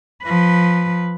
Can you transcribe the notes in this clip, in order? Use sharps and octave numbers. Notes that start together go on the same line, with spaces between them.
F3 B4